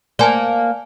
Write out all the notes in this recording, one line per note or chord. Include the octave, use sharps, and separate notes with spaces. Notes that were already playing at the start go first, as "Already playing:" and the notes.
A#3 C5 D5 G#5 A5